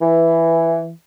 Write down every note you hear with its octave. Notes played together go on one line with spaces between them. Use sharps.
E3